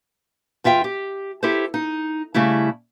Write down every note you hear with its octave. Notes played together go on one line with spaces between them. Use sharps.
E2 F4 E5 G5
G4
E4 G4 A4 C5
D#4
C#3 G3 A3 E4